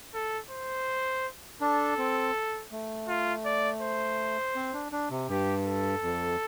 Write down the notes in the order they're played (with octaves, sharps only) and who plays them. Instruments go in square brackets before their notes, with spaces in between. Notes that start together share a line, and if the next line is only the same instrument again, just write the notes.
[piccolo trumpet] A4
C5
[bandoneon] D4 [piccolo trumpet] A4
[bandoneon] C4
A3
[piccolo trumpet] F4
D5
C5
[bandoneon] C4
D4
D4
C3
[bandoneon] G2 [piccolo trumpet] G4
[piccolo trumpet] A4
[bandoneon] F2